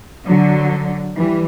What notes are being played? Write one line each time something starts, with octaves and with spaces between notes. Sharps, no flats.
D3 F#3
E3 G3